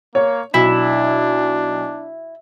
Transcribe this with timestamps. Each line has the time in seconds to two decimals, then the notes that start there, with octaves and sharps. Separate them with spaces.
0.15 A#3 C#5
0.54 B1 D4 E4